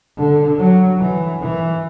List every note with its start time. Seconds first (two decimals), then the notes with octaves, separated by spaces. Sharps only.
0.17 D3
0.58 F#3
1.00 E3
1.42 E3